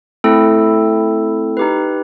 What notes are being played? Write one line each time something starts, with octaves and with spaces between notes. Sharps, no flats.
A3 C4 E4 A4
D#4 G4 B4